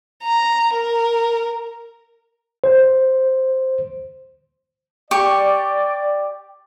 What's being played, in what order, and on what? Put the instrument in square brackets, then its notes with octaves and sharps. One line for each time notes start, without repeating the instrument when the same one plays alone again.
[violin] A#5
A#4
[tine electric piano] C5
[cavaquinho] G4 C#6 [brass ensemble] D5